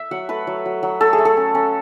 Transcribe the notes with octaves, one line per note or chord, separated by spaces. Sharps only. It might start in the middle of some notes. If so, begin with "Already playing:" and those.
Already playing: E5
F#3 F#5
A3 B4
F#3
F#3
F#3
A3 A4
G#4
A3
A4
C#4
C#4